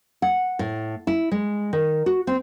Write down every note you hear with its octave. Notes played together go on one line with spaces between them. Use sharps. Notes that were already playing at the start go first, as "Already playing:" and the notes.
F#5
A2
E4
G#3
D#3
F#4
C4